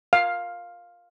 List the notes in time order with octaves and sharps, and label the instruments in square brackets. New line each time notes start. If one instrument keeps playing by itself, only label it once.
[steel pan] F5